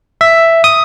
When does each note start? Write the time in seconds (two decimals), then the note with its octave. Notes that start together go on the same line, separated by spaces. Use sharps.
0.21 E5
0.64 D#6